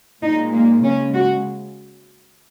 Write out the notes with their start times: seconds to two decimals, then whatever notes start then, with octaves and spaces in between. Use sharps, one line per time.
0.23 A#2 G#3 D#4
0.54 A#3
0.83 C#3 G#3 C#4
1.14 F#4